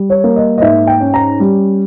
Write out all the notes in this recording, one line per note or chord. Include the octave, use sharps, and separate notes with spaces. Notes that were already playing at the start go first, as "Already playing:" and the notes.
Already playing: G3
C#5
A#3
D#5
D#5
G#2 E5
G5
C#4
A#5
G3